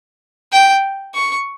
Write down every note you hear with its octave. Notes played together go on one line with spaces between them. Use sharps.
G5
C#6